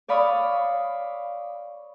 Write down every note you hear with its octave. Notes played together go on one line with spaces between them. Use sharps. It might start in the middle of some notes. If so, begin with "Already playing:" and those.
C#5 D5 F5 B5 C#6 D#6